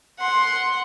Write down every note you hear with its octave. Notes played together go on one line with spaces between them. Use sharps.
F#5 C6